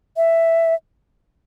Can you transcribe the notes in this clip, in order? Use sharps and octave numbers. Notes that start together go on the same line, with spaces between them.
E5